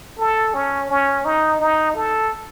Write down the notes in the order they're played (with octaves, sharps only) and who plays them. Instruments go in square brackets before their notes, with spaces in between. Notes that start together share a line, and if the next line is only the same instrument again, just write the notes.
[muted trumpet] A4
C#4
C#4
D#4
D#4
A4